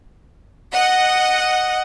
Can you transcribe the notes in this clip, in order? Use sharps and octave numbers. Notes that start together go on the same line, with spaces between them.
D#5 F#5